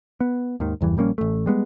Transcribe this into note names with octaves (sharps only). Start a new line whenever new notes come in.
B3
D#2 G#2 D#3
F#1 E2 G2 E3
A#1 G3 A#3 C#4
A1 A3
G3 G#3 B3